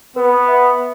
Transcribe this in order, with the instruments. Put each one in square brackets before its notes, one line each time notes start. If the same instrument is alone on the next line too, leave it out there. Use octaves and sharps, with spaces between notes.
[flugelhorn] B3 [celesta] B4
[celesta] E5